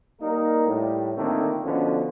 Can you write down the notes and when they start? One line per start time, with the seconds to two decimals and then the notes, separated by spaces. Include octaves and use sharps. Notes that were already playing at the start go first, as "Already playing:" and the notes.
0.21 G3 A#3 D#4 A#4
0.66 A2 G3
1.17 A#2 D3 D#3 A3 A#3 C4
1.64 B2 D3 F3 B3 C#4